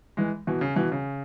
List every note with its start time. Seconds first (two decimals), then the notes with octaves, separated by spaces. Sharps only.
0.17 E3 G#3
0.47 B2 E3
0.61 C#3
0.76 B2 E3
0.92 C#3